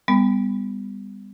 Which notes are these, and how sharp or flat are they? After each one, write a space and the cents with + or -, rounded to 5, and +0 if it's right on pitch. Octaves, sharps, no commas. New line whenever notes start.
G3 +35 B3 +20